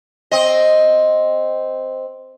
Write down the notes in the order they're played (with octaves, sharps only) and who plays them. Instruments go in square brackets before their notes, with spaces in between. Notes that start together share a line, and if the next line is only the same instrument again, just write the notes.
[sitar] C4 D#5